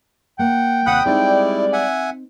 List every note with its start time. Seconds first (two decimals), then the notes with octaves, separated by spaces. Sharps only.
0.39 A#3 F#5 G5
0.87 D#2 C3 F#5 B5 D#6
1.06 G3 G#3 C4 D#4 E4 D5
1.73 E5 F#5 G#5